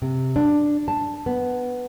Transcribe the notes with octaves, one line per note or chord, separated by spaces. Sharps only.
C3
D4
A5
B3